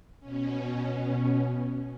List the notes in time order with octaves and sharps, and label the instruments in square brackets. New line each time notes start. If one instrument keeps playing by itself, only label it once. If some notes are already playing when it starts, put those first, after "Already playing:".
[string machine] B2 C#4